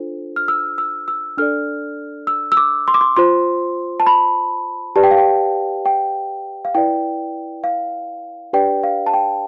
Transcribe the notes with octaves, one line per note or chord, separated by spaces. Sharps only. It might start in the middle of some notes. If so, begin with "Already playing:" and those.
Already playing: D4 F4 A4 C5
F6
E6
E6
E6
D4 A4 D5 F6
E6
E6
D6
C6
D6
C6
F4 C5 C6
A5
B5
G4 B4 D5 A5
G5
F5
G5
G5
F5
E4 B4 D5 G5
F5
D4 G4 B4 D5 G5
F5
A5
G5